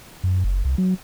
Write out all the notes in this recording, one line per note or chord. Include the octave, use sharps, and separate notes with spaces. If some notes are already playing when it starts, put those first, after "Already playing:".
F#2
F#1
C2
F#3